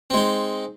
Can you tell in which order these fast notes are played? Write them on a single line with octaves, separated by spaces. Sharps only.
C4 G#3 D#4